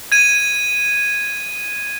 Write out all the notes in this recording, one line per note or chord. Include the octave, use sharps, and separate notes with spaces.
G#6 D#7